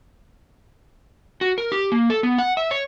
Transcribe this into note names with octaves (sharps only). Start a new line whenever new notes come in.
F#4
A#4
G4
A#3
A4
B3
F#5
E5
C#5